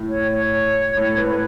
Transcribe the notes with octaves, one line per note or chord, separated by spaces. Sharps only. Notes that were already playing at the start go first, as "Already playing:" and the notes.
Already playing: A2
C#5
C#5
A2
A2 B4